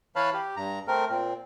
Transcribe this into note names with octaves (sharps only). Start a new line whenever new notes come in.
E3 B4 C#5 F5 A5 B5
G4
G2 A#5
A3 C4 A#4
A#2 C4